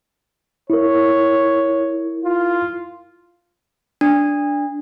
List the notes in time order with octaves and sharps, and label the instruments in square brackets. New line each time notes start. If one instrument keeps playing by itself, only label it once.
[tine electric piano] E4 A#4 [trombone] C#5
[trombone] F4
[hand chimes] D4